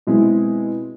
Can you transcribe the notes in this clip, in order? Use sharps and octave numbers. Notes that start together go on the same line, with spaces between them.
B2 G#3 C4 E4